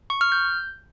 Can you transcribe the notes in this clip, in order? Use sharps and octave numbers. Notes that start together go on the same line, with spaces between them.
C#6
F6
G6